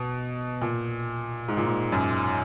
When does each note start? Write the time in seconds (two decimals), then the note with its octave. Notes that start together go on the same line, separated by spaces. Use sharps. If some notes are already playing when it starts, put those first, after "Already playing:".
Already playing: B2
0.62 A#2
1.48 G#2
1.57 A#2
1.66 G#2
1.92 F#2